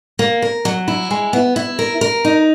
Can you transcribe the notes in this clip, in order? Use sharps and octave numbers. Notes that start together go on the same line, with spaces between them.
A#3
A#4
F#3
E4
G#3
B3
E4
A#4
A#4
D#4